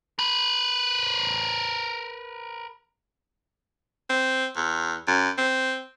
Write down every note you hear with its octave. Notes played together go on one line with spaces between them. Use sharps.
A#4 B4
C4
E2
F#2
C4